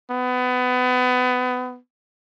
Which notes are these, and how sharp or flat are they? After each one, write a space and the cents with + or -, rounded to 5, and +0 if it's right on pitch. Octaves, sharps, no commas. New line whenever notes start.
B3 +25